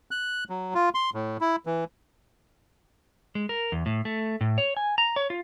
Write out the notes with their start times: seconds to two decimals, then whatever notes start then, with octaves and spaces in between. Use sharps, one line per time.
0.11 F#6
0.50 F#3
0.75 F4
0.95 C6
1.14 A2
1.41 E4
1.66 E3
3.35 G#3
3.49 A#4
3.72 E2
3.86 A2
4.05 A3
4.41 A2
4.58 C#5
4.77 G#5
4.98 A#5
5.16 C#5
5.30 F4